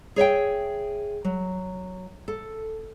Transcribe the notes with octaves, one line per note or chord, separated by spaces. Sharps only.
G#4 C#5 E5 G5
F#3
A4